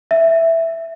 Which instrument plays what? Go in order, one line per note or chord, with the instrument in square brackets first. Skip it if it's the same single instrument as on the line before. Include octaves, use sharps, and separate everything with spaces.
[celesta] E5